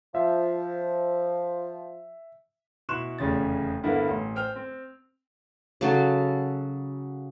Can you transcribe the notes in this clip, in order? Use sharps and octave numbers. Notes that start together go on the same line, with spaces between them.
F3 E5
B2 E4 C6 C#6 F#6 E7
F1 E2 C#3 C#4 A6
G2 D3 A#3 B3 E4
A1
C5 G5 F6 F7
C4
C#3 F#3 A4